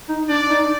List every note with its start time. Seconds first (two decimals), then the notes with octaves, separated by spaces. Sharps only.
0.09 D#4
0.30 D4 D5
0.50 D#4